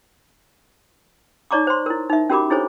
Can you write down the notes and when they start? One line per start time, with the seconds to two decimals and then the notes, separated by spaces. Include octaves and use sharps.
1.51 D#4 C#5 D5 A#5 C#6 D6
1.67 C5 C#5 C6
1.86 E4 A#4
2.10 D#4 E5
2.30 C#4 F#4 G4 A#4 B5 D6
2.50 D4 E4 G#4 A4 C5 C#5